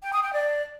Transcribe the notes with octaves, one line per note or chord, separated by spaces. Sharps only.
G5
D#6
G5
D5